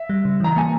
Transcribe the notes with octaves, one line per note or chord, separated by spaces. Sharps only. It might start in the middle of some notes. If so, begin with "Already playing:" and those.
Already playing: E5
G3
C#3
E3 A#5
A#3 G#5